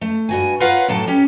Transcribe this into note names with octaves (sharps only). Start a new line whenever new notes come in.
A3
G2 F#4 G#5
F4 A#4 B4 C#5 F5 F#5
A2 F#3 A4 A5
C#4 G4